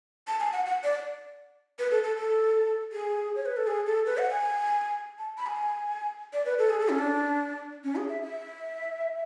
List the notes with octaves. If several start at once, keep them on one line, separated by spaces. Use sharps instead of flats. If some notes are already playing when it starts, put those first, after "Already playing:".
A5
G#5
F#5
F#5
D5
B4
A4
A4
A4
G#4
C#5
B4
A4
G#4
A4
B4
F#5
G#5
A5
B5
G#5
D5
B4
A4
G#4
A4
C#4
D4
C#4
G#4
E5
E5